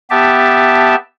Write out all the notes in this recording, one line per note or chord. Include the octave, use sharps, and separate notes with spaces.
B3 G4 E5 A5